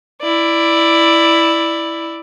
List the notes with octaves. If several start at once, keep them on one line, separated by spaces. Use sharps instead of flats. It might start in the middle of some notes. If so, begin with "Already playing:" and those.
E4 D5